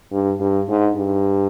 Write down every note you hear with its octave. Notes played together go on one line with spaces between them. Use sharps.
G2
G2
G#2
G2